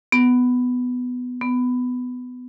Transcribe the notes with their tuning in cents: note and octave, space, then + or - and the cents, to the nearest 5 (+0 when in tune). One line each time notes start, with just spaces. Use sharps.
B3 +10
B3 +15